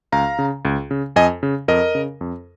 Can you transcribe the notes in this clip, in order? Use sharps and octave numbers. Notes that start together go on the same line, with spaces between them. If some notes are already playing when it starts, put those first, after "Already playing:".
C#2 F5 A#5
C#3
C#2
C#3
F2 D#5 G#5
C#3
F2 A#4 D#5
C#3
F2